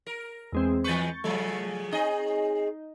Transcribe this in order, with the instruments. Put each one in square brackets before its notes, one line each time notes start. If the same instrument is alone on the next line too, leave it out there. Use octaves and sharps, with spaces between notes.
[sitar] A#4
[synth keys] E2 G#3 C4
[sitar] E3 G#3 B4 [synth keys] C#6 G6 A6
[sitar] C#3 F3 F#3 [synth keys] A3
[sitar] C4 G#4 D#5 [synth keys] D#4